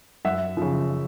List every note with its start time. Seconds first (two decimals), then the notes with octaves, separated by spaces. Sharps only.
0.25 F#2 E5 F#5
0.57 C#3 F3